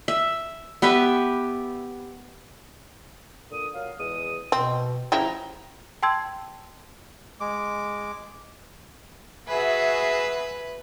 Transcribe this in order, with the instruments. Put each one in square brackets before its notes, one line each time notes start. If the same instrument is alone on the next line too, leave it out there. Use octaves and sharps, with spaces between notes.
[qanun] E5
B3 G4 B4 E5
[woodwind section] A#2 D3 D#6
A#2 F#3 F5
E2 G#3 D#6
[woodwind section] B2 [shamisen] C4
[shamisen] C#3 E4 G4 [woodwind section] F3 A#5
[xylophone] G5 A5 C6 E6 G#6
[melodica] G#3 D6
[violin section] F#4 G#4 E5 [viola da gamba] B4